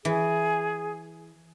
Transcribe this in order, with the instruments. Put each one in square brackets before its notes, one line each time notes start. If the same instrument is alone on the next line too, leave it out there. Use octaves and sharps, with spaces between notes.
[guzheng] E3 [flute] G#4